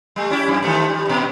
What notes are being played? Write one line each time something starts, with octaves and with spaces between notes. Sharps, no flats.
G3 A3
C#4 E4 G4
F#2
D#3 F3 A3
G3
G2 A#2